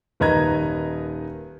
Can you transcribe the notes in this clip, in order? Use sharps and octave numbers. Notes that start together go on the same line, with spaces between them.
D#1 D#3 B4 D#5 A#5 G#6